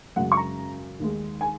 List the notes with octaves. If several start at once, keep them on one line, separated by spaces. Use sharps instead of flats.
F#2 C#3 G#3 F#5
C#6
A#5
D#2 D#3 G#3
G#5